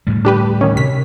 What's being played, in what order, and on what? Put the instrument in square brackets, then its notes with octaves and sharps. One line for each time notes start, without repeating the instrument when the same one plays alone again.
[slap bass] D2 A2 G3
[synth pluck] D4 G4 B4
D#3 C#4
[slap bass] C3 [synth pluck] B6